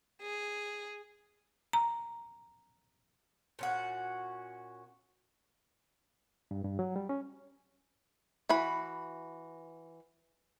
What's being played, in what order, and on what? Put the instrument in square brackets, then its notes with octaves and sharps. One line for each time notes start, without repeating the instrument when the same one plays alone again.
[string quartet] G#4
[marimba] A#5
[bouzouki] A#2 C#4 F#4
[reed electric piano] G2
G2
F#3
G3
C#4
[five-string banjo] E3 F#4 B5